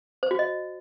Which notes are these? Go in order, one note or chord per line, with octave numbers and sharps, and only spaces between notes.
C5
F#4
D#5